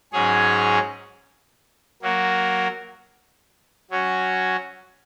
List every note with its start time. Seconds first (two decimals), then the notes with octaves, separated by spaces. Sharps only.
0.13 G#2 F#3 C#4 G#4 C#5
2.02 F#3 A#3 F#4 A#4
3.90 F#3 C#4 F#4